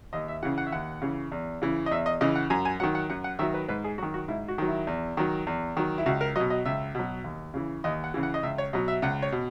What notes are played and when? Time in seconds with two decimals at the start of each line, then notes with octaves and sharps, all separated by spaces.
0.13 D#2 D#5
0.28 E5
0.43 C#3 E3 F#5
0.58 F#5
0.67 E5
0.72 D#2 F#5
1.02 C#3 E3
1.32 E2
1.62 C#3 E3
1.86 D#5
1.91 E2 E5
2.06 D#5
2.21 C#3 E3 D#5
2.36 F#5
2.50 F#2 G#5
2.65 G#5
2.80 D#3 F#3 F#5
2.95 F#5
3.10 F#2 F#5
3.24 F#5
3.39 D#3 F#3 E5
3.54 B4
3.68 G#2 B4
3.84 G#4
3.98 D#3 F#3 F#4
4.14 F#4
4.28 G#2 E4
4.48 F#4
4.58 D#3 F#3
4.68 E4
4.87 E2
5.17 D#3 F#3
5.47 E2
5.77 D#3 F#3
5.98 E4
6.06 C#2 F#4
6.21 A#4
6.36 B2 F#3 D#5
6.50 D#5
6.65 C#2 E5
6.95 B2 F#3
7.24 D#2
7.54 C#3 E3
7.84 D#2 D#5
8.04 F#5
8.14 C#3 E3
8.23 F#5
8.34 D#5
8.43 C#2 E5
8.58 C#5
8.73 B2 F#3 D#5
8.88 E5
9.02 C#2 F#5
9.22 C#5
9.32 B2